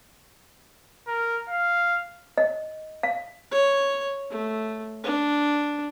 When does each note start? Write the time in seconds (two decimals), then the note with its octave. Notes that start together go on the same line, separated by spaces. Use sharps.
1.08 A#4
1.49 F5
2.38 D#5
3.03 F5
3.51 C#5
4.30 A3
5.04 D4